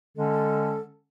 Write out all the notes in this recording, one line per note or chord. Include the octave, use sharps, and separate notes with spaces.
D3 G#3 C#4 A4